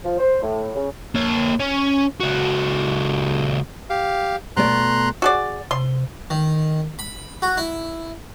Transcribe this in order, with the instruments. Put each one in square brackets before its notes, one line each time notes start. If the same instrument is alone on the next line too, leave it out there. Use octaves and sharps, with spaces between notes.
[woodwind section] F3
C5
A2
C#3
[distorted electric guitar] A#3 C#5
C#4
C#2 F#4
[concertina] G4 F5
[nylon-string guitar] B2 A3 D5 [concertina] A#5 C6 F#6
[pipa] F#4 G#4 D5
[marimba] C3 [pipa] C6
[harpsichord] D#3
B5
F#4
E4